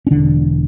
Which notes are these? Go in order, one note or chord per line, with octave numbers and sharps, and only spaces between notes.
C#4
E1 E2 D3 D4